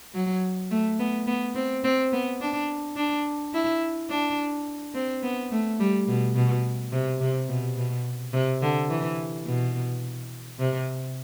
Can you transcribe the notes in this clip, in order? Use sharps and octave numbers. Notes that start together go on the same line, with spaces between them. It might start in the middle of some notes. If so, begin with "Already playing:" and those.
F#3
A3
B3
B3
C4
C4
B3
D4
D4
E4
D4
C4
B3
A3
G3
B2
B2
C3
C3
B2
B2
C3
D3
E3
B2
C3